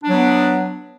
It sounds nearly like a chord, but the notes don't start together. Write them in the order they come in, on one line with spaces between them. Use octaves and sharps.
D4 F#3 B3